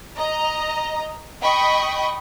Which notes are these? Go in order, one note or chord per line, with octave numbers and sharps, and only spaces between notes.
D#5 A#5
D#5 G5 B5 C#6 D#6